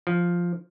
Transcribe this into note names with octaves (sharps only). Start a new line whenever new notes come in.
F3